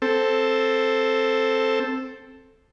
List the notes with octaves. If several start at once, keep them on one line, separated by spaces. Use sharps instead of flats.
C4 A4